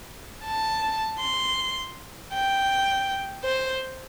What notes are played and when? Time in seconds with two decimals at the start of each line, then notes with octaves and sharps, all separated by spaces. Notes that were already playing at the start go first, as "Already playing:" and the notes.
0.45 A5
1.20 C6
2.33 G5
3.44 C5